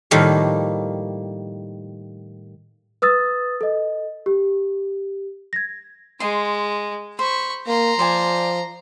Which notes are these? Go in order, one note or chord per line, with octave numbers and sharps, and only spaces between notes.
A2 D#3 F3 G3 A#3
B4 D#6 E6 A6
A4 D#5
G4
G#6 A#6
G#3 D#5 C6
C5 B5 C#6
A#3 A#5 C6
F3 C5 D5 G#5